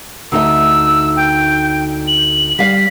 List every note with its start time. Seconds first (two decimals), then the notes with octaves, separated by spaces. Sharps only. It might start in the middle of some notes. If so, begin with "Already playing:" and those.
0.32 D2 D#4 E5 E6
1.16 G5
2.08 F#7
2.59 G3 F5 B6